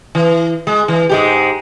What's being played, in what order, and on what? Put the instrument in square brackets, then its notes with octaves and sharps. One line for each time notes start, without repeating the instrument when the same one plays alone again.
[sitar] E3
G#3
E3
G#2 G#3 G4